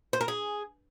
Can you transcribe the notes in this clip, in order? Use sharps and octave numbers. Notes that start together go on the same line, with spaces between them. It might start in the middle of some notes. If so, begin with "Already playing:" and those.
C5
A#4
G#4